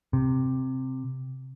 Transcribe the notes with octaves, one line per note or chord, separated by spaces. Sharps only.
C3